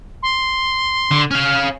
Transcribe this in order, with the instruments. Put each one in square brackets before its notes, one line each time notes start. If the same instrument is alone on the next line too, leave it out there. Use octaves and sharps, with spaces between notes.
[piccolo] C6
[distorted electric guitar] D3
[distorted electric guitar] C#4 F5 [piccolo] F6